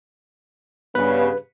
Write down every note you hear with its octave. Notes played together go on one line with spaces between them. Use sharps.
G2 C#3 B3 B4